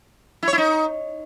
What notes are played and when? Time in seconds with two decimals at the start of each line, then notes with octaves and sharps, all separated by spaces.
0.43 E4
0.48 C#5
0.53 E4
0.58 D#4